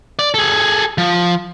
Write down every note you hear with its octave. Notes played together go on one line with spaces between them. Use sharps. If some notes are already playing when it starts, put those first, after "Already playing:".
D5
G#4 A4
F3